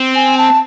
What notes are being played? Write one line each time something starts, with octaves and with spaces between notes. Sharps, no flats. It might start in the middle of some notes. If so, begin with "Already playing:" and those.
Already playing: C4
G#5
A5